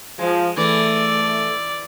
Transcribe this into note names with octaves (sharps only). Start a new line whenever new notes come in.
F3 G#3
E3 A3 D5